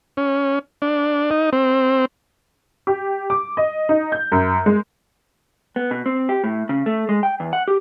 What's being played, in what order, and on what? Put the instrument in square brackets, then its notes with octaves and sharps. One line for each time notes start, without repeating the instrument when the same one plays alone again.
[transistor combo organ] C#4
D4
D#4
C4
[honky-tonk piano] G4
D6
D#5
D#4
G6
F#2
G#3
[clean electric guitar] B3
B2
C4
G4
A2
C#3
A3
G#3
G5
E2
F#5
G4